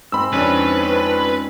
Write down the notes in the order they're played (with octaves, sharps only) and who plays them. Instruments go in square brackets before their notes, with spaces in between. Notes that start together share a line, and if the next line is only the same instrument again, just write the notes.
[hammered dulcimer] G#2 C4 [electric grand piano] B5 E6
[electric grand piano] F2 C#4 D4 [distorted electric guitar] B4